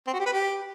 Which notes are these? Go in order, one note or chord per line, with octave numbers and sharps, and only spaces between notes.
C4
F#4
G4
B4
G4